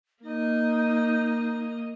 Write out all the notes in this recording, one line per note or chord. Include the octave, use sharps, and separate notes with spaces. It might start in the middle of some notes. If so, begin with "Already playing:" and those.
A#3 D#4 D#5